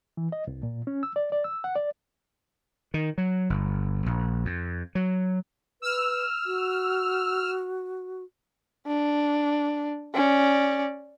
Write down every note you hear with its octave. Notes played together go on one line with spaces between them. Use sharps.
E3
D#5
C2
A#2
C#4
E6
D5
D5
E6
F#5
D5
D#3
F#3
G1
A#1
F2
F#3
B4 E6 F6
F#4
D4
C#4 D5